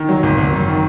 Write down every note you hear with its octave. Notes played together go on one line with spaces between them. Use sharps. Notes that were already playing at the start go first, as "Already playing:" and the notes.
Already playing: D#3
F#3
G#1
G#1
F#2
D#3